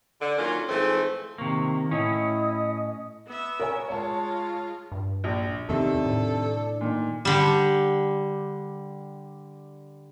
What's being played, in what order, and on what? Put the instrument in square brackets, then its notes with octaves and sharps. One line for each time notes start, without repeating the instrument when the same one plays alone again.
[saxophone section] D3
D#3 F#3 A#3 C#4 F4
G#2 E3 F3 G#3 A3 C4
[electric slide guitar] C3 A#3 [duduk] D#3 [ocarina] C#6
[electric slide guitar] A2 C#4 [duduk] E4 [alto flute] D#5 [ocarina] D#6
[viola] B3 E5
[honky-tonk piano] A#4 C#5 G#5
[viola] G#3 F4 [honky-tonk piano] C#5 A5
[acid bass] G2
[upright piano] A#1
[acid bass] E2 [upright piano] C3 D#3 [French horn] D4 [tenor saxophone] A4
[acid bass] A2
[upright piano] A#2 [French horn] D#3
[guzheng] D3 G3